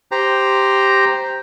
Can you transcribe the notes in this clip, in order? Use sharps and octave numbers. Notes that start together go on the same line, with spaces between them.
G4 C5 A#5